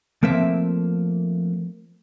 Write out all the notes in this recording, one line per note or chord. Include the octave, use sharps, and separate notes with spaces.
F3 A3 A#3 C4 E5